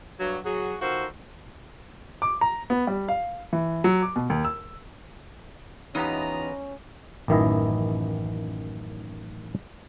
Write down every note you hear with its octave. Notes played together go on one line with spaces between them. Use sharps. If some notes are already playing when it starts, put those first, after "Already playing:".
G2 F#3
F#3 F#4 G#4
D#3 F4 F#4 A4 A#4 C5
D6
A#5
B3
G3
F5
E3
F#3
D6
B2
D#2
E6
E2 B3 C#4 D#4 F4 G4 D#5 A#5
A1 F#2 D#3 E3 E4 D#5